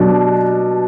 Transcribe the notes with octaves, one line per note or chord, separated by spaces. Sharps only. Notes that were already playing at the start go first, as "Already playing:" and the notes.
Already playing: B2 F#3 D4